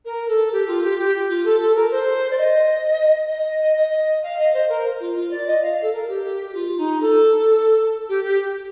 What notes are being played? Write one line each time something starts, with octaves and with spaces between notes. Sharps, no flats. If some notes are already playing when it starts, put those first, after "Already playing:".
A#4
A4
G4
F4
G4
G4
F4
A4
A4
A#4
C5
D5
D#5
D#5
D#5
F5
D#5
C5
A#4
F4
F4
D5
D#5
F5
A4
A#4
G4
G4
F4
D#4
A4
G4
G4